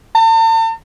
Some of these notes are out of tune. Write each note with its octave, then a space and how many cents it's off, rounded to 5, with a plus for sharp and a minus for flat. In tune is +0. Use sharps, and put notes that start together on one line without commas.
A5 +45